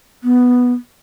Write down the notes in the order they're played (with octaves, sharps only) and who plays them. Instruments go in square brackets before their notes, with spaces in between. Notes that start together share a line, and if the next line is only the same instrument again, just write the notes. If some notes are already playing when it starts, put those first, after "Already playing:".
[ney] B3